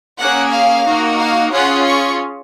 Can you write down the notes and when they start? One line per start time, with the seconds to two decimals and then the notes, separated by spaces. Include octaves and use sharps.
0.18 A#3 C#4 G#4 F#5
0.51 F5
0.86 A#3 D#4 F#4
1.19 F5
1.52 C#4 F4 G#4 F#5
1.85 C#6